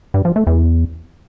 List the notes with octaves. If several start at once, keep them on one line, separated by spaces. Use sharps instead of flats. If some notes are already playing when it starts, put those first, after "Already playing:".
G2
F3
A3
E2